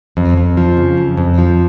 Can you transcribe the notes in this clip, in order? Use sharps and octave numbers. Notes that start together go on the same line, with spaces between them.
F2
F2
F3
C#3
F2
F2
F3